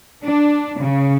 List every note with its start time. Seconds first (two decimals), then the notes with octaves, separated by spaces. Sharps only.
0.24 D4
0.78 C#3